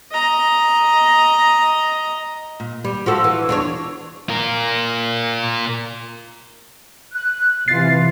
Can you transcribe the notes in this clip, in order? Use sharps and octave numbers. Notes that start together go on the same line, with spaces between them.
D#5 A#5
A#2
G3
F3 F#4 A4
E3
E2 D4 C#5
F4 A#4
F#6
C3 E3 F4 A6 C7